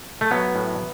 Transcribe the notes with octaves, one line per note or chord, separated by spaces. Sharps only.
A3
F#3 B3
A2